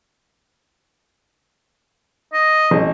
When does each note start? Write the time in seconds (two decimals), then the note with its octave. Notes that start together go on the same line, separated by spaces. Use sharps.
2.34 D#5
2.71 A1 D#5